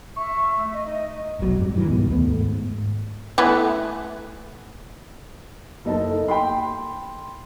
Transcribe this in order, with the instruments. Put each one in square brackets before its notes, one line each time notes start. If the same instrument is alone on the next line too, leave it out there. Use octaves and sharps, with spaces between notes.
[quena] E5 [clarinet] C#6
[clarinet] A3
[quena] D#5
[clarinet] D#4 [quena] D#5
[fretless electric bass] F1 B1 C3 F#3
E1 F2 G#2 G3
G2 D#3 E3 F#3
C#2 G#2 B2 D#3
D#2 A3 B3
G#2
[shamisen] E3 A3 B3
[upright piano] F#1 D#4 A4
G5 B5 C6